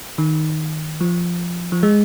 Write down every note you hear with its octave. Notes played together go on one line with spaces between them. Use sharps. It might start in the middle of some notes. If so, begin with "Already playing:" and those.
D#3
F3
F3
G#3